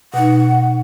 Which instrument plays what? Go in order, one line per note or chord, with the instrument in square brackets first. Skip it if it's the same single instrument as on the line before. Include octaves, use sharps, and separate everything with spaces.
[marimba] B2 D#4 [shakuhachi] F#5